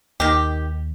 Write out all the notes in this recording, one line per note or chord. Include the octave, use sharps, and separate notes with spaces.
D#2 D#3 G4